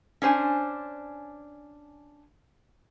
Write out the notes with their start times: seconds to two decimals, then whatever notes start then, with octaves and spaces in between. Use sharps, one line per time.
0.22 C#4 D4 C5 G#5